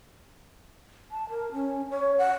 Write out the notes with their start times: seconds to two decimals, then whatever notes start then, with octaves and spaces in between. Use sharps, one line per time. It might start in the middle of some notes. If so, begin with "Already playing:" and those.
1.11 A5
1.29 A#4
1.52 C#4
1.90 C#5
2.18 F#5